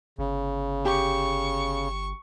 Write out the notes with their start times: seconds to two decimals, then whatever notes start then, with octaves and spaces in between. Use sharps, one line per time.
0.19 G1 C#3
0.85 G4 C#6